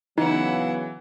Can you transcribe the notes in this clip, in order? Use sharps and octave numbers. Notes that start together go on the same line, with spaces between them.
C#3 E3 F#3 B3 D#4 E4 F#5